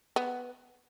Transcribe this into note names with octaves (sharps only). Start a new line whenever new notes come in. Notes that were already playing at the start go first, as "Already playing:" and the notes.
B3